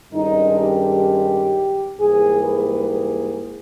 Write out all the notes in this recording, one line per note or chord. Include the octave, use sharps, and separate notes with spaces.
G2 D#3 G#3 C#4 D#4
G4
G#2 E3 G3 A#3 G#4
B4
G#4